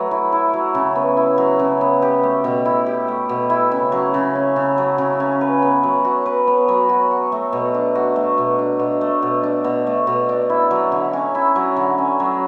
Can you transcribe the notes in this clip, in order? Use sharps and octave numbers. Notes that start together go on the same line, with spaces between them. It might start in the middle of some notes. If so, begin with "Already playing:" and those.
Already playing: F#3 A3 B4
E4
E4
F#3
C#3
B3
E4
F#3
C#3
B3
G4
A3
B2
E4
G4
A3
B2
E4
C#3
F#3
C#3
C#4
C#3
F#3
C#3
C#4
B4
B3
F#3
F#4
B4
B3
F#3
F#4
F#4
A3
B2
D4
F#4
A3
B2
D4
B2
A3
B2
D4
B2
A3
B2
D4
E4
F#3
D3
C#4
E4
F#3
D3
C#4
F#3